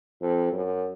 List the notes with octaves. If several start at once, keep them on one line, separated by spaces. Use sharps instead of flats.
F2
F#2